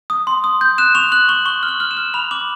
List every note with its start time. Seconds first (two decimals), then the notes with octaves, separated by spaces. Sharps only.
0.10 D#6
0.27 C6
0.44 D#6
0.61 G6
0.78 F#6 E7
0.95 C#6 F7
1.12 F#6 F#7
1.29 C#6 F#7
1.46 C#6 G7
1.63 F6
1.68 F#7
1.80 F6
1.91 E7
1.97 F6
2.14 B5 F7
2.31 D6 F#7